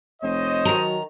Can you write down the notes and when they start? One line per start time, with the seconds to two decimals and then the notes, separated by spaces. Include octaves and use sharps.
0.22 F1 C5 C#5 D#5
0.65 D#3 F#3 A#5